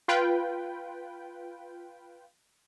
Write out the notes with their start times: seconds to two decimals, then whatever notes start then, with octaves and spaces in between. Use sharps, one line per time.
0.08 F4 B4 G5